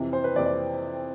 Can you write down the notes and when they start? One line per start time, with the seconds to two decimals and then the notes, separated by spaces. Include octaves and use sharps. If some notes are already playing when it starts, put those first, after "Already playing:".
Already playing: F2 C3 E3
0.13 C5
0.24 B4
0.35 F2 C3 E3 D5
0.46 D5